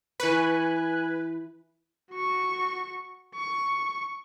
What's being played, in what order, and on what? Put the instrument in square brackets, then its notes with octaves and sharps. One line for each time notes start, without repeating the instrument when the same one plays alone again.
[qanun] E3 C#6 [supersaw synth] B4 [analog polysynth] G#5 F#6
[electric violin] F#4 C#6
C#6